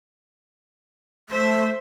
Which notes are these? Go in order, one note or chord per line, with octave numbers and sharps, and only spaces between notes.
A3 C5 E5